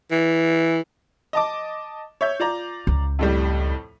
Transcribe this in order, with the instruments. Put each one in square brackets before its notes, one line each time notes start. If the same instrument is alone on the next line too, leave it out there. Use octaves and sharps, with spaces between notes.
[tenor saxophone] E3
[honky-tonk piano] D#5 A5 D6
C#5 E5 G6
F4 D5 A#5
[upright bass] C#2
[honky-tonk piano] F2 A2 G3